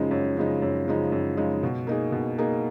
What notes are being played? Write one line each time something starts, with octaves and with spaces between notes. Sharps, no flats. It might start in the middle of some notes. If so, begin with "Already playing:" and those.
Already playing: F#2 C#3 F3 G#3 D#4
F#2
C#3 F3 G#3 D#4
F#2
C#3 F3 G#3 D#4
F#2
C#3 F3 G#3 D#4
B2
A#3 D#4 G#4
B2
A#3 D#4 G#4